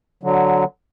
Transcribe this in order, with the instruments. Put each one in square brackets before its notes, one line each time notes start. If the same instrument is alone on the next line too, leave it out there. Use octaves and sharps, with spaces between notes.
[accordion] D3 F#3